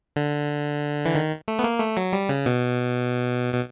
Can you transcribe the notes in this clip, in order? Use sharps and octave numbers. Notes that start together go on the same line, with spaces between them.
D3
E3
D#3
A3
B3
A#3
A3
F#3
G3
C#3
B2
B2